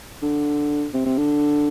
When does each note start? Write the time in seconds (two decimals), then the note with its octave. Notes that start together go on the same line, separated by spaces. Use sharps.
0.23 D3
0.94 C3
1.06 C3
1.18 D3